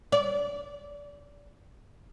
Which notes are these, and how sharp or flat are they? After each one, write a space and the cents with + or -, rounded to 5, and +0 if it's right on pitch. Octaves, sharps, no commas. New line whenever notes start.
D5 -30